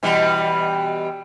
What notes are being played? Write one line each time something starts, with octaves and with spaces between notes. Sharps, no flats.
B2 E3 G3